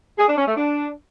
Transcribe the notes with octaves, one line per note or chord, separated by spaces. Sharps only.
G#4
D4
C#4
A3
D4